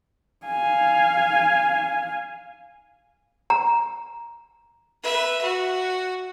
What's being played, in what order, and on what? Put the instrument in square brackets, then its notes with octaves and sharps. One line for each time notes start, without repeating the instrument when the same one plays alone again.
[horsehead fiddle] F5 G#5
[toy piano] A#5
[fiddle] B4 E5
F#4